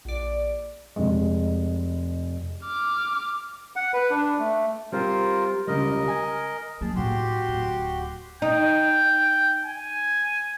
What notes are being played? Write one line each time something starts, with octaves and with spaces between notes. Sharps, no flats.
A#1 D5
F1 G#3
D6 F6
F#5
B4
D4
A3
G3 C4 F4 A#4 C5
C#2 C#3 G3 A#4 D#5
G#5
F#3 A#3 G#4 A5
A2 D#3 F#4 G4 C6
D1
D#4 G5
G#5